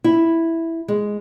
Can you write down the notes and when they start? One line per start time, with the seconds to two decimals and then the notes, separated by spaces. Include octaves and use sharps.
0.04 E4
0.88 G#3